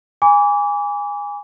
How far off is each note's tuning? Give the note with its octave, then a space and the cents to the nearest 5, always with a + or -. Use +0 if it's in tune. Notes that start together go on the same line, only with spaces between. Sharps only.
G#5 -20 B5 +0 D6 -30